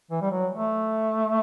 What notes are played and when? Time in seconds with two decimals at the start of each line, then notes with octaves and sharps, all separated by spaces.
0.11 E3
0.22 G3
0.31 F#3
0.53 A3